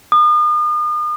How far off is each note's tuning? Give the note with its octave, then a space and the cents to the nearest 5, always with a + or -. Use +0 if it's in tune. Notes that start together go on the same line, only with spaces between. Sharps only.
D#6 -40